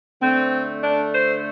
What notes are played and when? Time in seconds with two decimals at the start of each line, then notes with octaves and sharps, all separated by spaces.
0.21 D3 A3 C4
0.82 D4
1.13 C5